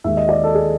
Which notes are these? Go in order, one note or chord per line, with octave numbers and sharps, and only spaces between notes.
D#2 D#3 G#3 E5
D#5
D5
A4
G#4